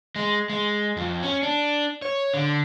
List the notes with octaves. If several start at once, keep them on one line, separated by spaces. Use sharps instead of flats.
G#3
G#3
F2
C#4
D4
C#5
D3